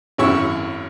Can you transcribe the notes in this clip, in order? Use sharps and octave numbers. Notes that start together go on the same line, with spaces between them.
G#1 F#2 F#3 E4 C#5 C#6